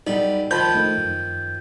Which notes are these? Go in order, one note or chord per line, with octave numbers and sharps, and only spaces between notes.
B1 G3 D#4
D#3 F3 C5 A5 B5 G6
A3 D#4
F#2